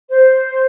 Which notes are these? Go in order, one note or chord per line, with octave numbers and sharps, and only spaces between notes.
C5